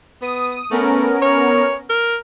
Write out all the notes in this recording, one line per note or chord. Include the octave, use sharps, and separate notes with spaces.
B3 D#6
A3 B3 C#4 A#4
C#5
A#4